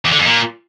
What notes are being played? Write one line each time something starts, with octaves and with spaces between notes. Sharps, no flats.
E2
D3
F2
A#2